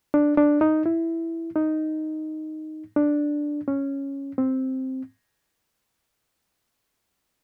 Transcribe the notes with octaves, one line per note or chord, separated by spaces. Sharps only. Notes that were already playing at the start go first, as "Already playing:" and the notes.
D4
D4
D#4
E4
D#4
D4
C#4
C4